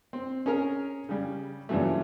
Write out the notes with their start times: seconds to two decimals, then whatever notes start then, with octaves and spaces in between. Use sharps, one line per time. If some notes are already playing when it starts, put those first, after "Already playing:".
0.13 C4
0.46 C#4 G#4 A#4
1.09 C#3 G3
1.69 G2 A#2 C#3 E3 F#3 A3